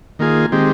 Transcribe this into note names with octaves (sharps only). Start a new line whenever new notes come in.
D#3 A#3 F4 G#4
D#3 G#3 C4 G4